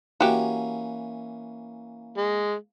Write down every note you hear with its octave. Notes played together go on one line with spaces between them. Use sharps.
E3 A#3 C#4 F#4 G4
G#3